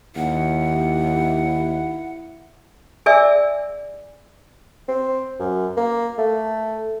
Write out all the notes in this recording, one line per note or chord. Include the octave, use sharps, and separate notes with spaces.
D#2 E4 F#5
G#4 D5 E5 G#5 E6
C4
F#2
A#3
A3